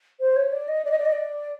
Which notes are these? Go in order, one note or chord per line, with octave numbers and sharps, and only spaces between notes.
C5
C#5
D5
D#5
D5
D#5
D5
D#5
D5